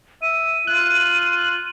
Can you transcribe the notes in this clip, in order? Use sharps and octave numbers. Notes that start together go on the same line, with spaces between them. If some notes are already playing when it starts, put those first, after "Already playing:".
E5 D#7
F4 F#6